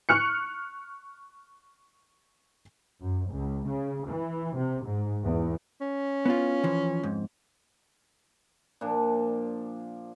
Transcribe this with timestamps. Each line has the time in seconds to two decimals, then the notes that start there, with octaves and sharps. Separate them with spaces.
0.09 C#6 F6 F#6 C#7
3.01 F#2
3.31 C#2
3.67 C#3
4.08 E3
4.55 C3
4.86 G#2
5.24 E2
5.81 C#4
6.25 B3 E4 F4
6.63 E3 F3
7.03 F2 G#2
8.81 A#2 F3 D4